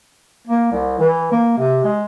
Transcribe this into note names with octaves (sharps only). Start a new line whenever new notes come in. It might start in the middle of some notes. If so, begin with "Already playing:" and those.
A#3
C2
E3
A#3
C3
G#3